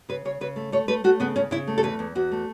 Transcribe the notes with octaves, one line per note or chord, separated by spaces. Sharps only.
C#3 B4
C#3 C#5
C#3 B4
A3
A3 C#5
A3 B4
A3 F#4
C#3 B3
C#3 C#4
C#3 E4
A3
A4
E2 B4
E2
E2 F#4
A3